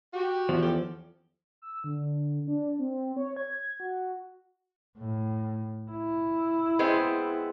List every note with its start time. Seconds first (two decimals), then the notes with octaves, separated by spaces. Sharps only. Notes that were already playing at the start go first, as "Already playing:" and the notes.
0.14 F#4 G4
0.49 E2 F3
0.62 C#4 G4 A4
1.62 E6
1.84 D3
2.47 D4
2.79 C4
3.17 C#5
3.36 G#6
3.80 F#4
4.98 A2
5.91 E4
6.79 G#3 B3 C4